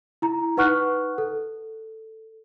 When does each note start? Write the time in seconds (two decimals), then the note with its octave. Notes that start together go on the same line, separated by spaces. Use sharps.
0.22 E4 A#5
0.57 D#4 B4 F#5 C#6 F6 F#6
1.18 A4